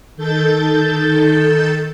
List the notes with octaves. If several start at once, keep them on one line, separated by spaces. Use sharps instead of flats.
D#3 A4 G6 A6